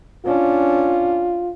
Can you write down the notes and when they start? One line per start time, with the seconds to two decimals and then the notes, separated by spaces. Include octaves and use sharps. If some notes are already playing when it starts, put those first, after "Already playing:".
0.26 C#4 D4 F4